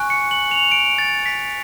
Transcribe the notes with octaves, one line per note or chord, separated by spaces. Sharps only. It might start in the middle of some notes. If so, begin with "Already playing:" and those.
Already playing: G#5 C#6 F#6
C#7
F#7
F7
D7
A6
B6